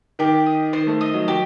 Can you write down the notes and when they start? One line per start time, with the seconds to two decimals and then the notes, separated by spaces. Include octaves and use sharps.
0.19 D#3 G4
0.46 D#5
0.73 D#3 C5
0.87 A3
1.01 D#5
1.14 F#3
1.28 F#3 G4